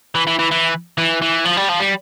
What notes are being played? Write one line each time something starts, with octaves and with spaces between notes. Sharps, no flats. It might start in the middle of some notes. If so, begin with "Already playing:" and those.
E3
E3
E3
E3
E3
E3
F3
G3
F3
G3